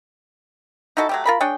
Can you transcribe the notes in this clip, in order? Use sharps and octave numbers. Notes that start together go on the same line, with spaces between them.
D#4 E4 F#4 A4
F#3 A3 G4
F4 A#4 B5
D4 G#4 C#5 G5